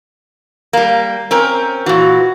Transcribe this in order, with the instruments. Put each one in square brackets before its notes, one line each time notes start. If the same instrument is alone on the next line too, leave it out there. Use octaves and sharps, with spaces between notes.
[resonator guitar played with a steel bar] G3 A#3
C4 C#4 A#4
[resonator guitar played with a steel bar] A#2 E3 [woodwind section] F#4